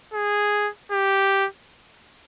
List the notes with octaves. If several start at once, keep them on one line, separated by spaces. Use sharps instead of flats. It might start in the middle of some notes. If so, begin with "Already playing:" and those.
G#4
G4